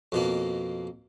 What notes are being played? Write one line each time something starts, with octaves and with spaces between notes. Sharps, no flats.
F2 B2 A#3